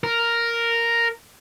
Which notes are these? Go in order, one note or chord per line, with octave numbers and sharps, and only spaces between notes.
A#4